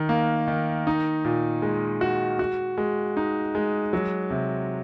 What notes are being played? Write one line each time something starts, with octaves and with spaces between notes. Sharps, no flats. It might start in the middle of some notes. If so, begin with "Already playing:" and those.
Already playing: D#3 D#4
A#3
D#3
D#4
A#2
G#3
F#4
F#4
G#3
D#4
G#3
F#3
C3